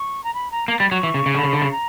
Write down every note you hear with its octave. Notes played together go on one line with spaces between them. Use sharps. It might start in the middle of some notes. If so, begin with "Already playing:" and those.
Already playing: C#6
A#5
B5
A#5
A#3 A#5
G3 B5
F#3 C#6
E3
C#3
C#3
D3 B5
C#3
D3
C#3
A#5